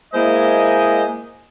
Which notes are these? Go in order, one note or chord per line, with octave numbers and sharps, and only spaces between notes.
G#3 A#3 E4 C5 D#5 G#5